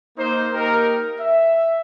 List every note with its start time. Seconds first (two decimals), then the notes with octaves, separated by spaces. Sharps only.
0.18 A#3 D#4 C5
0.54 A#3 D#4 G4 A#4
1.20 E5